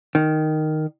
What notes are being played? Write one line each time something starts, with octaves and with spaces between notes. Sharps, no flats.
D#3